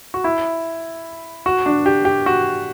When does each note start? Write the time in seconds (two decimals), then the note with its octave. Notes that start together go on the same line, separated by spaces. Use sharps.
0.14 F#4
0.24 E4
1.46 F#4
1.66 D4
1.86 G4
2.05 G4
2.26 F#4